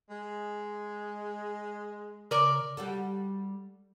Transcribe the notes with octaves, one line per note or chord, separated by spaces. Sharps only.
G#3
C#3 A#4 D5 D6
G3 F#4 A4